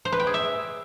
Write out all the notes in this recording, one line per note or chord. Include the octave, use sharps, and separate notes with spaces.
C5
B4
G5
G#4
E5